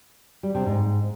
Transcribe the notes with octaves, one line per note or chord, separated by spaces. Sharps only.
G3
C3
G#2